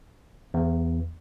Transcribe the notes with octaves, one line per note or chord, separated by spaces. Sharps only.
E2